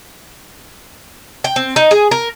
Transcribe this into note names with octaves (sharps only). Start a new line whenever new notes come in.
G5
C4
D#4
G#4
A#4